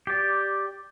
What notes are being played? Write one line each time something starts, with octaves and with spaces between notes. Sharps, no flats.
G4 D5